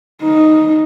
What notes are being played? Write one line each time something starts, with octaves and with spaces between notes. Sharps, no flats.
D#4